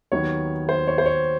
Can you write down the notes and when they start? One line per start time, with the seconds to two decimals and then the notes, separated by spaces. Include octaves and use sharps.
0.12 D#2 D#3 F#3 B3 C#5
0.69 C5
0.87 C#5
0.98 C5
1.06 C#5